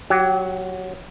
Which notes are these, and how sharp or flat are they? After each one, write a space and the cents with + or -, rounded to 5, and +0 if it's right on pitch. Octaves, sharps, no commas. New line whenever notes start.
F#3 +0 G4 -25